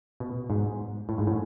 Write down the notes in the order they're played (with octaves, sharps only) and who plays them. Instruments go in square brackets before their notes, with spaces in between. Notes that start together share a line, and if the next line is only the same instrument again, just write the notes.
[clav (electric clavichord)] B2
G#2
A2
G#2
A2